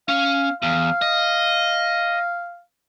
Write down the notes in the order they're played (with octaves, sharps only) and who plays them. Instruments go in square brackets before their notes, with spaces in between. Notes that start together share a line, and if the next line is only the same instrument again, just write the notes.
[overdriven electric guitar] C#4 [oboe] F5
[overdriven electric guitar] E2 [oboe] F5
[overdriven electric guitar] D#5